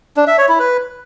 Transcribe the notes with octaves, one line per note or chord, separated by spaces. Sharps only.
D4
E5
C#5
E4
B4